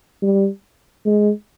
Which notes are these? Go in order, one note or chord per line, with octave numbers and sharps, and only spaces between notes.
G3
G#3